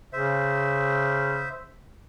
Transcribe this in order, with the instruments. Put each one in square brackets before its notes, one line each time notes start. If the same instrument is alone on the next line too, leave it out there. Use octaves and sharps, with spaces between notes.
[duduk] C#3 [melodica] C5 E5